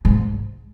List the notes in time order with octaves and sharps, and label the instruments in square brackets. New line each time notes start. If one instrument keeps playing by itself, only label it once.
[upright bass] G#2